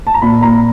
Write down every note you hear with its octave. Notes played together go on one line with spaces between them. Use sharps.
A5
A#5
A#2 B5
A#2 A#5